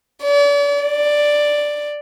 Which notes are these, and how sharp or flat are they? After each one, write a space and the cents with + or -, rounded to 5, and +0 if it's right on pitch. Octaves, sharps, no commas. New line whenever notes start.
D5 -40
D5 +5